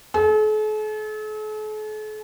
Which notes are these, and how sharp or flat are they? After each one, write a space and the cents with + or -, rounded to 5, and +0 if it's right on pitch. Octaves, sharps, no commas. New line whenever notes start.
A4 -45